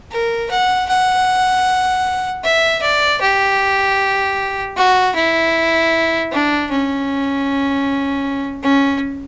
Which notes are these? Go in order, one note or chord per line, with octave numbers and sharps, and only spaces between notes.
A#4
F#5
F#5
E5
D5
G4
F#4
E4
D4
C#4
C#4